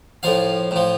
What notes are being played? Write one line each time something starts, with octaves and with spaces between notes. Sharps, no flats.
A2 F3 F5
A2 F3